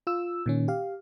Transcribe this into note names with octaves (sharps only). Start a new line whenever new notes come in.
F4 E6
A#2 D#3 C#4
G4 F5